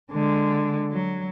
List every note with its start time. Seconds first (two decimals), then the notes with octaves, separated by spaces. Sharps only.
0.11 D3 G#3
0.91 F#3